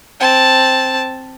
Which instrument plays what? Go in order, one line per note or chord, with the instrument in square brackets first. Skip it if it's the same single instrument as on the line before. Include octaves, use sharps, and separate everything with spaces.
[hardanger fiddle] C4 A5